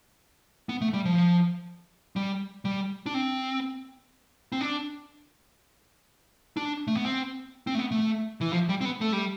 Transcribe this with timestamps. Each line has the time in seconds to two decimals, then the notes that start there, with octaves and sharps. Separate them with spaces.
0.69 B3
0.81 A3
0.93 G3
1.05 F3
2.16 G3
2.65 G3
3.06 D4
3.14 C4
4.52 C4
4.61 D4
6.57 D4
6.87 A3
6.97 B3
7.06 C4
7.67 C4
7.75 A3
7.79 B3
7.91 A3
8.41 E3
8.53 F3
8.69 G3
8.81 C4
8.85 B3
9.01 A3
9.13 G3